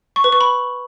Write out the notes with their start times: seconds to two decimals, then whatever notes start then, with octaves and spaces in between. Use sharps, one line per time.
0.16 C#6
0.24 B4
0.32 C#6
0.41 B5